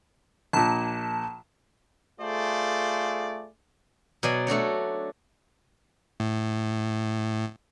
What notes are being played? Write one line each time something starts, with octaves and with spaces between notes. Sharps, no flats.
A#1 A#2 A5
A3 F4 G#4 A4 C5 D5
B2 F#3 D5 G#5
A3 D4 F#4 C#5
A2